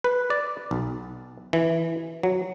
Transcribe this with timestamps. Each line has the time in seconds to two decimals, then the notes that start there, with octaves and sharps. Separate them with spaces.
0.04 B4
0.30 D5
0.71 B1
1.53 E3
2.23 F#3